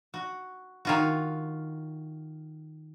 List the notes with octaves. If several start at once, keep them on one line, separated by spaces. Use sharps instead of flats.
F#4
D#3 F4 F#4